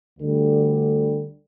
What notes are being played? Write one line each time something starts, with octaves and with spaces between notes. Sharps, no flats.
D2 D3 G3